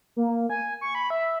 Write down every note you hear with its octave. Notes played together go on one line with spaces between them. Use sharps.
A#3
G#5
C#6
B5
E5